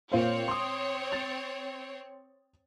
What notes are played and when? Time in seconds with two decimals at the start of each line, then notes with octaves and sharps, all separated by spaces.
0.12 A#2 C4 C5 C#5 F5
0.48 C6 D#6
1.12 A6 F7